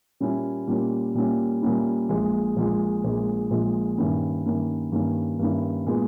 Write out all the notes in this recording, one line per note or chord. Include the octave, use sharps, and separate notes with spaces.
A#2 G3 A#3 C#4 E4
A#2 G3 A#3 C#4 E4
A#2 G3 A#3 C#4 E4
A#2 G3 A#3 C#4 E4
A#1 A#2 G#3
A#1 A#2 G#3
A#1 A#2 G#3
A#1 A#2 G#3
G2 D#3 A#3 C#4 E4
G2 D#3 A#3 C#4 E4
G2 D#3 A#3 C#4 E4
G2 D#3 A#3 C#4 E4
A#2 G#3 B3